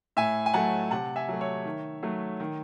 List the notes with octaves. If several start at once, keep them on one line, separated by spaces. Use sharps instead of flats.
A2 E5 G#5
G#5
F#3 A3 F#5 A5
C3 F#5 A5
E5 G#5
F#3 A3
C#5 E5
D#3
F#3 A3
D#3